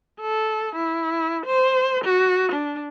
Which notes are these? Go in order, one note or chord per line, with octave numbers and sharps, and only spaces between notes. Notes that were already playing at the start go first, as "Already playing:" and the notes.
A4
E4
C5
F#4
D4